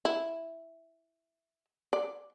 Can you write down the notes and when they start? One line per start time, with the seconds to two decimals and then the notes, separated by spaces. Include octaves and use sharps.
0.05 E4
1.93 D5